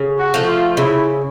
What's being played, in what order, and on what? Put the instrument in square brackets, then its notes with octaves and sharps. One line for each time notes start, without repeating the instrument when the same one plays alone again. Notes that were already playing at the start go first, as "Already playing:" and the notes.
Already playing: [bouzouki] C#3
[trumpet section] F#4
[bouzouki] F3 A3
[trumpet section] F4
[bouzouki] C#3 [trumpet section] E4